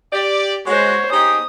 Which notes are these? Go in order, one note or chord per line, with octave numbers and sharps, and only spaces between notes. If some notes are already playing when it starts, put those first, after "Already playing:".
G4 D5
G#3 F#4 C5 C#5
D#4 G4 G#4 D#6